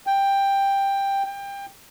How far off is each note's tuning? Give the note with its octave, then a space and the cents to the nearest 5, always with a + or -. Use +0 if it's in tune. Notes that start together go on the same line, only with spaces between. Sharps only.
G5 +10
G5 +25